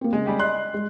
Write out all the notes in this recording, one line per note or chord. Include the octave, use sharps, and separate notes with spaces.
A#3 C4
C#3 G#3
G3 G#3 G4
D5 D#5 C6 F#6
G#3